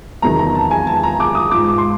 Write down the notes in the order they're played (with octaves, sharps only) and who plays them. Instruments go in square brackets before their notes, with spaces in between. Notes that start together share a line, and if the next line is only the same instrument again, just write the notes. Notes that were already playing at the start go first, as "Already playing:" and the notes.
[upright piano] E2 C3 D#3 F#3 A#5
A#5
A5
G#5
A5
A#5
D6
D#6
G#2 F3 D6
C6